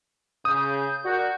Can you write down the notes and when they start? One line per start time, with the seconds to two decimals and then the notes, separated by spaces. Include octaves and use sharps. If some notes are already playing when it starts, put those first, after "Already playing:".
0.45 C#3 D#6 G6
1.05 F#4 A#4 D5